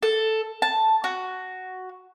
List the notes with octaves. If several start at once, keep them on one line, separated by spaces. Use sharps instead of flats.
A4
A5
F#4